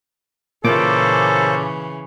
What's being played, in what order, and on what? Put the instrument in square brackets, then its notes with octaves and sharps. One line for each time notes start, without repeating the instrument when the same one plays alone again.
[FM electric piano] A#2 D6 [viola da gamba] C#3 E3 [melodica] A#3 C#4 C5 [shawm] A4